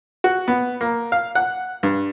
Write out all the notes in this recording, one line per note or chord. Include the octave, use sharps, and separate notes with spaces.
F#4
B3
A#3
F5
F#5
G2